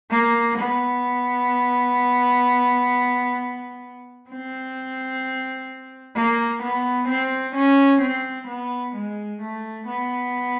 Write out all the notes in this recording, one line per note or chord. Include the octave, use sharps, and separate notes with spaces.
A#3
B3
C4
A#3
B3
C4
C#4
C4
B3
G#3
A3
B3